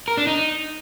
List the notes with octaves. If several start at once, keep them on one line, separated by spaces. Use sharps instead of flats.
A#4
D4
D#4